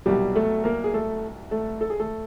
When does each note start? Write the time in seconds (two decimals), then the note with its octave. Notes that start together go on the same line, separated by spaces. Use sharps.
0.06 C2 B2 F#3 G3 G4
0.36 A3 A4
0.64 A#3 A#4
0.84 G#4
0.93 A3 A4
1.51 A3 A4
1.81 A4
1.90 G#4
2.00 A3 A4